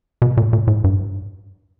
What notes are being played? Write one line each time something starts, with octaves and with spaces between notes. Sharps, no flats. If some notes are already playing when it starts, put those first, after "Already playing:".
B2
A#2
A#2
A2
G2